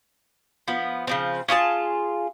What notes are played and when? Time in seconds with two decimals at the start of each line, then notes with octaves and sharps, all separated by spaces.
0.68 F3 B3
1.07 C#3 F3 C4
1.48 C#4 F4 G#4 A5